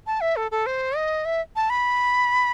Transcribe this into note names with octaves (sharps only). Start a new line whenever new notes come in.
A5
E5
A4
A4
C5
D#5
E5
A5
B5